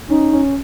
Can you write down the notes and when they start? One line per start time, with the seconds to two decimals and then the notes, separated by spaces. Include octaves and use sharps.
0.09 C#4 D#4
0.33 C#4